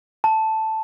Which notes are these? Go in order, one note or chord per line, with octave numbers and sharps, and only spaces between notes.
A5